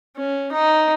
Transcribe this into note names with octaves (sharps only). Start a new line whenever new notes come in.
C#4
D#4